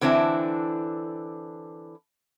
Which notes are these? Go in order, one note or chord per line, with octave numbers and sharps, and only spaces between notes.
D3 E3 C4 D4 E4